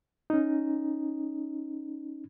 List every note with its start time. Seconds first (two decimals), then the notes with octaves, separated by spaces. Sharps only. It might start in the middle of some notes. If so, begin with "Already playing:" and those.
0.30 C#4 D#4